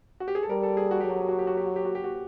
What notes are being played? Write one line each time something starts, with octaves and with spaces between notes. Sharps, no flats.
F#4
G4
G#4
A4
G3 A#4
A4
G#4
F#4
F#3 G4
F#4
G4
F#4
G4
F#4
G4
F#4
G4
F#4
G4
F#4